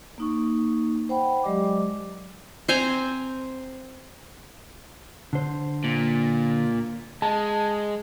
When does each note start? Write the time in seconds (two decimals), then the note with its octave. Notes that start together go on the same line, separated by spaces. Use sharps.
0.18 A#3 D#4 C#6
1.09 C5 F#5 G5 B5
1.43 F#3 G#3 G4 D5 D#5 D6
2.68 C4 C5 G#5 A#5
5.33 D3 C5
5.84 A#2
7.22 G#3 A5